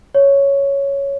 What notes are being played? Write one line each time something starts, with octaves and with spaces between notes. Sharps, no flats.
C#5